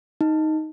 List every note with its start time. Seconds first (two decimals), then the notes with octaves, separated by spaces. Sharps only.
0.21 D#4